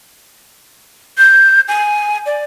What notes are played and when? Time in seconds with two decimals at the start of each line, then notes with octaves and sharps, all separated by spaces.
1.18 G6
1.68 G#5
2.26 D5